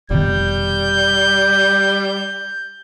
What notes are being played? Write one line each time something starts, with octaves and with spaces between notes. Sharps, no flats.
F1 B2 D#3 G3 G6